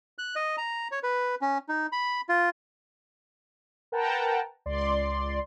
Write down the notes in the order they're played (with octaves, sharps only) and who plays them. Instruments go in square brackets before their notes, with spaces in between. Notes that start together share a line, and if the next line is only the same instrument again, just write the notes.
[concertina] F#6
D#5
A#5
C#5
B4
C#4
D#4
B5
F4
[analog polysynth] A#4 B4 F#5 G5 A5 A#5
C#2 D5 C6